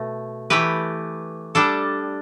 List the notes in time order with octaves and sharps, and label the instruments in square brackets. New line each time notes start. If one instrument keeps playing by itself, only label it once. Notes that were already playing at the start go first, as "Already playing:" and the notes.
Already playing: [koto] B2 A3
E3 A3 G4 B4
G3 D4 A4